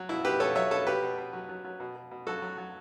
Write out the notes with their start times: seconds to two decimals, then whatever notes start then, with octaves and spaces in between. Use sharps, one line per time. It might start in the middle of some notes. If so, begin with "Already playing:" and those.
Already playing: F#3
0.09 B2 E4
0.25 B2 G4 B4
0.40 B2 A4 C#5
0.55 F#3 C#5 E5
0.71 B2 A4 C#5
0.87 B2 G4 B4
1.02 B2
1.18 B2
1.33 F#3
1.49 F#3
1.64 F#3
1.80 B2
1.95 B2
2.11 B2
2.27 F#3 F#4 A4
2.42 F#3
2.58 F#3